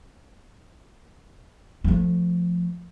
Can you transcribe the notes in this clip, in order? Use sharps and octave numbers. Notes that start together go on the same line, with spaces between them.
F3 A3